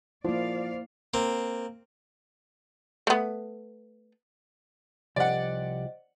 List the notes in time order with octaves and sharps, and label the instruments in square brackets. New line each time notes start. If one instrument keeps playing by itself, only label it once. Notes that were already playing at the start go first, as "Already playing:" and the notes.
[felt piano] F3 [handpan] A#3 E4 [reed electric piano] C5 [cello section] D5 F5
[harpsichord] A#3 C4
[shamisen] A3 B3
[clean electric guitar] C2 F3 G4 [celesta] C5 D#5 [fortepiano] D5 F#5